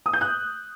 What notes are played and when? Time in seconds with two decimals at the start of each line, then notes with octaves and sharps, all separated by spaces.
0.06 D#6
0.13 G6
0.21 F#6